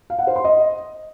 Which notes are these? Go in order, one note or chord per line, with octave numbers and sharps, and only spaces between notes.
F5
F#5
C5
C6
D#5